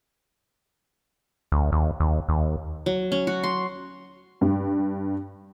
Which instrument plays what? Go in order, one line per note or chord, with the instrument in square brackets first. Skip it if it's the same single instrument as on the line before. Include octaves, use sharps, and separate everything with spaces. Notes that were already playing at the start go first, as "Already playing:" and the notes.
[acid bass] D2
D#2
D#2
D#2
[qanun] F#3
C#4
F#4
C6
[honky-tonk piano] G2